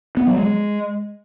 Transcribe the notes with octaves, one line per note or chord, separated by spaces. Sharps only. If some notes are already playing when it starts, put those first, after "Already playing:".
B3
F#3
G#3